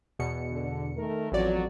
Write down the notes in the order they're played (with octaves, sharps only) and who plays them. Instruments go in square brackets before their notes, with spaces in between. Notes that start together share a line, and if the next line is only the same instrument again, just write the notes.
[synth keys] E2 B2 C#7
[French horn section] D3
D#3 A3 A#4
[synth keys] A1 D5 [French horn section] F2 F#3